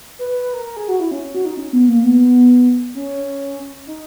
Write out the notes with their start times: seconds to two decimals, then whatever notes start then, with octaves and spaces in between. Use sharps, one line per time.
0.19 B4
0.31 B4
0.43 B4
0.53 A#4
0.66 A#4
0.77 G#4
0.88 F#4
1.00 E4
1.11 C#4
1.22 C#4
1.34 F#4
1.45 D#4
1.57 C#4
1.73 B3
1.88 A#3
2.03 B3
2.95 C#4
3.87 D#4